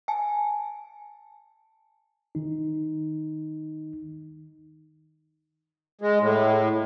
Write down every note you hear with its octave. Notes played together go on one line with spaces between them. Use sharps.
G#5 A5
D#3 D#4
G#3
A2